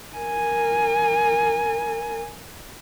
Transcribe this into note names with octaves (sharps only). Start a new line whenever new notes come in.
A#4 G#5